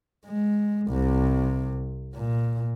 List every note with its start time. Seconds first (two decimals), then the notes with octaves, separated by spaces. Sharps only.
0.26 G#3
0.89 C2 C3
2.15 A#2